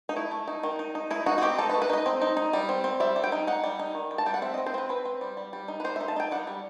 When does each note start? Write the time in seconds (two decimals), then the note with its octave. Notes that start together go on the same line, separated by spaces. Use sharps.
0.09 D#4
0.16 A3 E4
0.31 A3
0.48 D#4
0.63 D#3
0.79 D#4
0.95 D#4
1.10 D#4 E4
1.26 D#4 F#4
1.38 F#4
1.42 C4 G4
1.58 D#4 A4
1.70 B4
1.74 A3
1.82 B4
1.90 D#4 D#5
2.06 C4
2.21 D#4
2.37 D#4
2.53 G3
2.69 C4
2.84 C4
3.00 G3 E5
3.16 G3
3.24 G5
3.32 D#4
3.47 D#4 F#5
3.64 G3
3.79 D#4
3.95 D#3
4.11 G3
4.18 A5
4.26 G3 G5
4.34 F#5
4.42 C4 E5
4.54 C4 D#5
4.66 C5
4.74 C4 B4
4.89 C4 B4
5.05 C4
5.21 G3
5.37 G3
5.53 G3
5.68 D#4
5.80 B4
5.84 G3 C5
5.96 D#4 E5
6.08 A5
6.16 D#4 G5
6.31 G3 F#5
6.47 G3